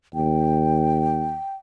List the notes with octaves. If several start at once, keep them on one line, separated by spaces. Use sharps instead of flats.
D#2 G5